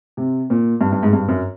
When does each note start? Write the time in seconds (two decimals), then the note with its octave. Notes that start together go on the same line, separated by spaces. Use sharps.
0.17 C3
0.50 A#2
0.81 G2
0.92 G2
1.03 G#2
1.13 G2
1.28 F#2